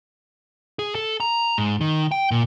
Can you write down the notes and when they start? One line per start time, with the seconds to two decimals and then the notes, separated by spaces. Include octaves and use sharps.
0.79 G#4
0.95 A4
1.20 A#5
1.58 G#2
1.81 D#3
2.11 G5
2.31 A#2